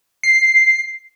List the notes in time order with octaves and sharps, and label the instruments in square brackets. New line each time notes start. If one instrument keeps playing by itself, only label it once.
[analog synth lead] C7